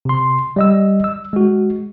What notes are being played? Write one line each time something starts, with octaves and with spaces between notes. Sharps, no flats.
C3 C6
G3 D#5 E6
E6
G#3 F#4